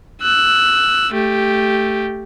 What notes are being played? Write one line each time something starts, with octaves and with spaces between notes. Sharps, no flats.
E6 F#6
A3 G4